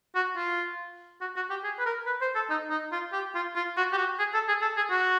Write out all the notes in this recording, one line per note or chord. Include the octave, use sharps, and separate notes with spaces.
F#4
F4
F#4
F#4
G4
G#4
B4
A#4
B4
C5
A4
D#4
D#4
F4
G4
F4
F4
F#4
G4
F#4
G#4
A4
G#4
A4
G#4
F#4